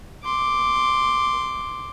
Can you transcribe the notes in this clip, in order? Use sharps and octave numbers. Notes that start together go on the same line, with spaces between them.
C6 D6